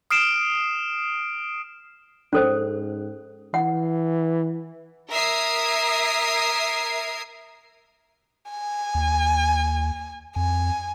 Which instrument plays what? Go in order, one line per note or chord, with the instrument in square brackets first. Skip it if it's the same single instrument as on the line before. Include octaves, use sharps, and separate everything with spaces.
[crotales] D#6 F6 C7 D7 E7
[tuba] G#2 [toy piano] C#4 A4 C5
[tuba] E3 [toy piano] F#5
[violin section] A#4 E5 D#6 G#6 C7
[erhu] G#5
[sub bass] D#2
[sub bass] F2 [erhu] G#5